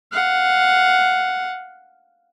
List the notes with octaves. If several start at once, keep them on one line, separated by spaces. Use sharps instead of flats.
F5 F#5